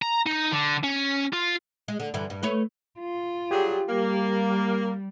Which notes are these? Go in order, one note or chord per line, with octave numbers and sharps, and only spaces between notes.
A#5
D#4
D3
C#4
F4
G#3
D3
G2 D3 E3
G2
A3 B4 C#5
F4
F#3 G3 G4 G#4
G3 A#3